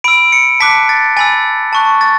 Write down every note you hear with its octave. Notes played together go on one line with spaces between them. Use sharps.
B5 E6 D7
C#7
A5 D6 F#6 B6
A6
G#5 B5 E6 A6
A5 C#6 F#6
A6